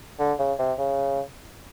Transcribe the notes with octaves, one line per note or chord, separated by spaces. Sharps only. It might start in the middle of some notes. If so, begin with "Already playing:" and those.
D3
C#3
C3
C#3